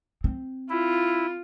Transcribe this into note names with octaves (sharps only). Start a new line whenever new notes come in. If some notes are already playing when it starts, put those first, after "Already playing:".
C4
E4 F4